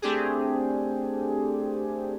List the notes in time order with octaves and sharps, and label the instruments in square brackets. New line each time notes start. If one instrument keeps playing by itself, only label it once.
[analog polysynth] A3 C4 D4 G4 G#4